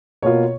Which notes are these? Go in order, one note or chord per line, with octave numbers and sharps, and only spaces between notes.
B2 A#3 F4 C#5